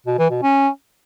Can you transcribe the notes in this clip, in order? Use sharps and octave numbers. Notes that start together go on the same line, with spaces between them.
B2
E3
B2
C#4